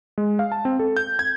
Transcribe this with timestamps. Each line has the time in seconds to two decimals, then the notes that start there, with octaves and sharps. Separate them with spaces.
0.18 G#3
0.39 F5
0.52 A5
0.65 C4
0.79 A4
0.97 G6
1.19 G#6